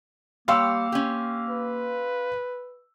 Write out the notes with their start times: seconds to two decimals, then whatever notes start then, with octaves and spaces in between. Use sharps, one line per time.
0.48 G3 A#3 G4 C#5 F5 C6 E6
0.92 C#4 G4
1.49 B4